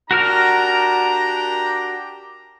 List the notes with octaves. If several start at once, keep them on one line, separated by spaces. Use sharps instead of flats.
D4 F#4 G4 A#4 A#5 F6